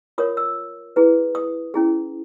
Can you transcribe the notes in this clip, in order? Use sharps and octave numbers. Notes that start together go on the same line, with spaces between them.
F4 A#4 C#5 D#6
E6
E4 G#4 B4
D#6
C#4 E4 G#4